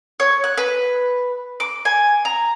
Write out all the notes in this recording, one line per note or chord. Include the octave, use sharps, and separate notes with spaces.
C#5
F#6
B4
D6
G#5
A#5